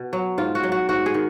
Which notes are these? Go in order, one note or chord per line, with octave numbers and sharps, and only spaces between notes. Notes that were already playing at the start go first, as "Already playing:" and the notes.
Already playing: B2
F#3
G#2 F4
F#4
F#3
F#4
G#2 F#4
G#4
D#3